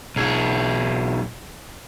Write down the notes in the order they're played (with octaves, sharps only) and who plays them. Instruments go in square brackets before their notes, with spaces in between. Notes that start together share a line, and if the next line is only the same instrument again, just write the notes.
[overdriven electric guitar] B1 G#4